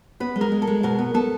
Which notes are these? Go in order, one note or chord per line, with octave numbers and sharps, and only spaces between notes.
B3 B4
G#3
A#4
G#3
A4
G#3
B2 A#4
B3
B3 A4